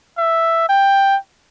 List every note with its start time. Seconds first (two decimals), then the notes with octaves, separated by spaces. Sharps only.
0.18 E5
0.69 G5